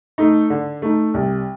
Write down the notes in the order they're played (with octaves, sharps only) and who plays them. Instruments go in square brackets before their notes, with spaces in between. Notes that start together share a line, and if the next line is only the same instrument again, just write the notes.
[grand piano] A3 D#4
D3
A3 D#4
C2